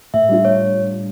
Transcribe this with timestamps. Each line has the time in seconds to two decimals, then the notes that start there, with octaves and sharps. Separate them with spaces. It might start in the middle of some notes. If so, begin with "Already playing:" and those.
0.14 A2 E5
0.29 G3 D4 F4
0.44 A2 C#5